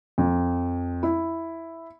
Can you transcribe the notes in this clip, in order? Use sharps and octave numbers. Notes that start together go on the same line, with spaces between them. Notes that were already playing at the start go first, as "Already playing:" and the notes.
F2
E4